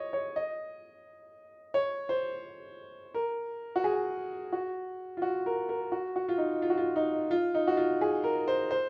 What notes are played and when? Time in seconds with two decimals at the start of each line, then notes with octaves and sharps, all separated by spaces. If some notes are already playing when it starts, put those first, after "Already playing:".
Already playing: C#5 D#5
0.13 C#5
0.36 D#5
1.74 C#5
2.09 C5
3.14 A#4
3.76 F#4
3.84 G#4
4.52 F#4
5.17 F4
5.22 F#4
5.46 A#4
5.69 A#4
5.92 F#4
6.16 F#4
6.29 F4
6.38 D#4
6.62 F4
6.70 F#4
6.77 F4
6.96 D#4
7.31 F4
7.55 D#4
7.67 F#4
7.77 F4
8.01 G#4
8.24 A#4
8.48 C5
8.71 C5